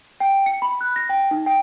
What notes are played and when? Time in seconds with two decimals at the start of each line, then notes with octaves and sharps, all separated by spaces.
0.20 G5
0.46 C#7
0.62 B5
0.81 F#6
0.96 A#6
1.09 G5
1.31 D#4
1.46 G5